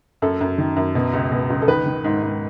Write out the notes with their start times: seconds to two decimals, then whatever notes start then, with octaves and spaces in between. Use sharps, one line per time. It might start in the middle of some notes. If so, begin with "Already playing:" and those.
0.22 F#2 A4
0.41 F#2
0.58 D#3
0.76 F#2
0.95 B2
1.13 C#2
1.32 B2
1.50 C#2
1.62 A4
1.68 D#3 B4
1.86 D#3
2.04 G#2
2.22 G#2